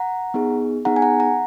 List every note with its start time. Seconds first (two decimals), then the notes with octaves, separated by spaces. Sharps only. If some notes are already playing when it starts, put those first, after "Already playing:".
Already playing: F#5 A#5
0.34 B3 D#4 G#4
0.85 B3 D#4 G#4 F#5 A#5
0.96 G#5
1.02 F#5 A#5
1.20 F#5 A#5